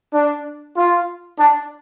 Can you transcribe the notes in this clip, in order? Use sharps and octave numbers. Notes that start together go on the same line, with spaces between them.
D4
F4
D4